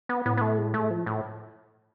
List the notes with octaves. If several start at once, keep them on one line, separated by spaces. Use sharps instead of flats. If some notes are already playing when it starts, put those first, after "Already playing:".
B3
A2 B3
B3
A3
G#3
A3
F3
A2